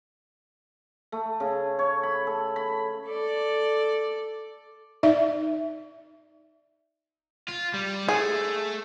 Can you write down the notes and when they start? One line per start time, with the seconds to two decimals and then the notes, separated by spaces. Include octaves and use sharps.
1.12 A3
1.40 C#3
1.79 C#5
2.03 B5
2.27 A4
2.56 B5
3.06 A4 D5
5.03 D#4 D5 E5
7.49 F4
7.74 G3
8.09 A3 G#4